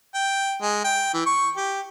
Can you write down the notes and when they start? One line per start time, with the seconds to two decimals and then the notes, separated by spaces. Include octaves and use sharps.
0.14 G5
0.61 G#3
0.84 G5
1.14 E3
1.26 C#6
1.56 G4